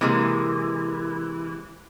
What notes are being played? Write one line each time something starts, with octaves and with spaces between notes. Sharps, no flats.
C3 E3 G#3 A#3